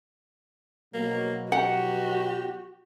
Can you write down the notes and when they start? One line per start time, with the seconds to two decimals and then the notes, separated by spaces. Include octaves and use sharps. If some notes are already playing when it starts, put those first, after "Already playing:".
0.94 B2 F#3 A#3
1.52 F#4 G4 F#5